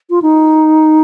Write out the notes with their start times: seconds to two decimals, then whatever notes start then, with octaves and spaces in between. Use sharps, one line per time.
0.10 F4
0.22 D#4